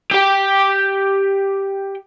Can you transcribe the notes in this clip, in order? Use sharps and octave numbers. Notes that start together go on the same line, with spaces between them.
G4 G5